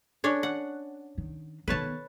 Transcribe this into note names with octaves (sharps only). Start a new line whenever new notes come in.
C#4 D4 C#5
F#5
D#3
D#3 B3 B4 C#5 A5